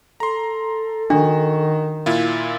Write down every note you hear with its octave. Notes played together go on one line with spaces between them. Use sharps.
A4 A#5 C6
D#3 D4 F#4
A#2 E4 F4